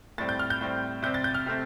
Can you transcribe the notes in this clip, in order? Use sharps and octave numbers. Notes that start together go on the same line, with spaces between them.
A2 G3 C4 A6
G6
F6
G6
A2 G3 C4
C3 G3 C4 G6
A6
G6
F6
C3 A3 C4